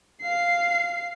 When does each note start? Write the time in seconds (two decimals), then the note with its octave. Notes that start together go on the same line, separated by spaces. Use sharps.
0.22 F5 C7